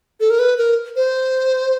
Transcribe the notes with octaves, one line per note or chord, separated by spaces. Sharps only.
A4
A#4
B4
A#4
C5